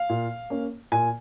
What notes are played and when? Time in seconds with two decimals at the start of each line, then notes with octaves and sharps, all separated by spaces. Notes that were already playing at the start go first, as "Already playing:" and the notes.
Already playing: F5
0.09 A#2
0.50 A#3 C#4
0.92 A#2 G#5